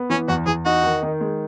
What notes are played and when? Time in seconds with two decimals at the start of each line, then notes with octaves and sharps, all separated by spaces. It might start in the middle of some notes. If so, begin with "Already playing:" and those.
Already playing: B3
0.10 E3 C#4
0.28 E2 F#4
0.46 E2 G#4
0.65 D#4 F#4
0.83 D#3
1.03 D#3
1.21 G#3